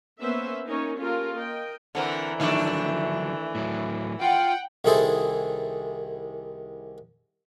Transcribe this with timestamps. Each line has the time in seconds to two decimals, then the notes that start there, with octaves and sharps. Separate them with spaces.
0.21 A#3 B3 C#4 B4 C5 E5
0.68 A#3 C#4 D#4 A#4 C#5
0.99 A#3 C#4 F4 G4 A4 A#4
1.34 A#4 D#5 G5
1.95 D3 E3 C4 A#4
2.40 D3 D#3 F3 F#3 A3 D4
3.55 A2 F#3
4.21 F4 F#5 G5
4.85 C2 D#3 E4 G#4 A4 C5